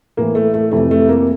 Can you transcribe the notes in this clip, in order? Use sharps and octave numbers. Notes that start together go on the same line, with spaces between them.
A2 E3 A#3
A3
A3
F2 C3 E3 A3
A3
A#3